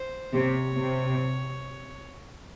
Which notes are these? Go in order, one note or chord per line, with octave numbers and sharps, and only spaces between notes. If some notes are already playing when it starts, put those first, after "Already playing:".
Already playing: C5
C3 C#5
C3